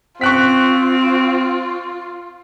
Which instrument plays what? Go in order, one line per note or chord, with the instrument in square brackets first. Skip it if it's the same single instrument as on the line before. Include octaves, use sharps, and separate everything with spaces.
[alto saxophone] C4 [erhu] F4 [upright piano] C#6 F#6 B6